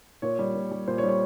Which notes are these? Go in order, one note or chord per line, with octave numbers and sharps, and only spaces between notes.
A#2 C#5
G3
A#2
G3
A#2 C5
C#5
G3
C#5